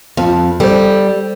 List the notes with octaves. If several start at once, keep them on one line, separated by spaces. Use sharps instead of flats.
F2
G3 A4 C5